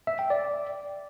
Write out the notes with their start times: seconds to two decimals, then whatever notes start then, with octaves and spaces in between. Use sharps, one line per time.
0.07 E5
0.19 G5
0.30 D5